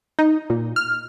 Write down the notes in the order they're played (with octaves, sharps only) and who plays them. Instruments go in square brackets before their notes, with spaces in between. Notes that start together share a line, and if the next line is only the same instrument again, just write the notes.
[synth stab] D#4
A#2
F6